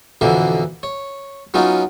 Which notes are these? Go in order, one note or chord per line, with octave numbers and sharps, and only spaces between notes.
F2 B2 D3 E3 A#3 B3
C#5
F#3 B3 C#4 D#4 F4